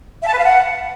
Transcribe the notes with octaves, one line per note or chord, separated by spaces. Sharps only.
E5
A5
B4
F5
F#5